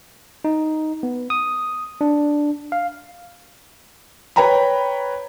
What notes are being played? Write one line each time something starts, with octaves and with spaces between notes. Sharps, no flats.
D#4
B3
D#6
D4
F5
B4 C#5 G5 A#5 B5